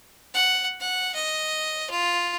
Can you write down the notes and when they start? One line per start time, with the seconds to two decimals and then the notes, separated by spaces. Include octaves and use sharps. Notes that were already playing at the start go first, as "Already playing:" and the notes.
0.34 F#5
0.80 F#5
1.15 D#5
1.90 F4